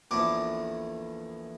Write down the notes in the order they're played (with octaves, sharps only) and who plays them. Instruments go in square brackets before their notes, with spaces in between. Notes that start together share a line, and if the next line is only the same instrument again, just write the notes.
[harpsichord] A#1 E2 A3 [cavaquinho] D6